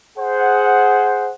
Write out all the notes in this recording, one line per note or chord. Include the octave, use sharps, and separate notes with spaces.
G#4 C5 F#5